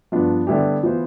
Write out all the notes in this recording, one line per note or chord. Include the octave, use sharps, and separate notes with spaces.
G2 F3 B3 D4
D3 G3 B3 E4 G4
E3 B3 F4 C5